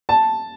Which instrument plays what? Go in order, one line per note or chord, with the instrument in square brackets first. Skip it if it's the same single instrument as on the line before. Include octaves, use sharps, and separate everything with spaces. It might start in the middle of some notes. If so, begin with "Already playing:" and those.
[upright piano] A5